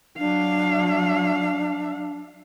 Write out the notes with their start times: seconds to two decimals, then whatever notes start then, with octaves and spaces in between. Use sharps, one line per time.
0.18 F#3 D4 F5